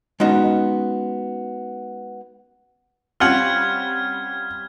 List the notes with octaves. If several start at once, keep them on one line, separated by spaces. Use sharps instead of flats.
G#3 B3 C#4 D#4 F#4
G3 C4 C#4 F4 F#5 F6 G#6